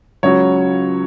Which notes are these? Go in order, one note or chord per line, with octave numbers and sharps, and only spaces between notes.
C#2 C#3 F#3 C#5